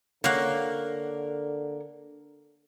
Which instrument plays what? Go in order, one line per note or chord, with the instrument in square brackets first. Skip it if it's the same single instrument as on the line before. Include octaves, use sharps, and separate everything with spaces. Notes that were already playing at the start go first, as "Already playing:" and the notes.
[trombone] D3 [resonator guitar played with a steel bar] A#3 [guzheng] C#5 F5 F#5